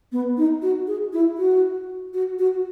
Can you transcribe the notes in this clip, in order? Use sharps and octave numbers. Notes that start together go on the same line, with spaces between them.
B3
D#4
F#4
G#4
E4
F#4
F#4
F#4